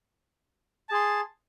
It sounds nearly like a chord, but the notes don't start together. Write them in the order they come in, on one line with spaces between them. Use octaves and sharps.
A5 G#4 C6